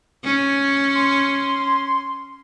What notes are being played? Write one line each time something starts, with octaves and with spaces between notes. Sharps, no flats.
C#4
C6